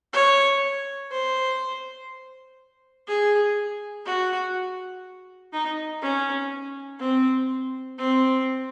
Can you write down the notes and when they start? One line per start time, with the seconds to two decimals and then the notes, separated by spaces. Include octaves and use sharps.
0.13 C#5
1.11 C5
3.08 G#4
4.06 F#4
5.53 D#4
6.02 C#4
7.00 C4
7.98 C4